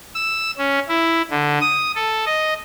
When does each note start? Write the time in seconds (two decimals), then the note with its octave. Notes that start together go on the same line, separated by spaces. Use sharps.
0.15 E6
0.58 C#4
0.89 E4
1.30 D3
1.61 D#6
1.95 A4
2.26 D#5